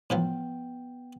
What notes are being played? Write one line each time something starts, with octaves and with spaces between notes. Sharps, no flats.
A2 E3 F3 B3 G5